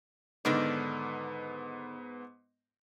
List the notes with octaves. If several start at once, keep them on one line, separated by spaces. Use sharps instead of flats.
G#2 D3 D#3 B3 D4